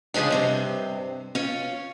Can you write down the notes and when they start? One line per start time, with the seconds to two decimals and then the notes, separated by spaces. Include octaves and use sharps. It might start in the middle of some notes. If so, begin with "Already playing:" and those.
0.14 C#3 F3 G#3 C#4 D4
0.30 G2 C3 C5
1.35 C#4 F4